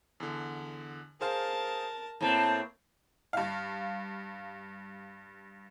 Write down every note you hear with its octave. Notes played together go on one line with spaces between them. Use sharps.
E2 D3
G#4 A#4 C5 F5 A5
A2 A#3 C4 B4 A5 A#5
G2 F5